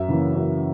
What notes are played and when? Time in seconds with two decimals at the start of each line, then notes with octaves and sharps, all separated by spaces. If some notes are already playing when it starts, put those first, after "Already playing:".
Already playing: F#2 E5
0.09 C#3 E3 A#3
0.35 F#2